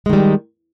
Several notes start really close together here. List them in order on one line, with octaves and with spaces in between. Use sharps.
G#3 D#3 G3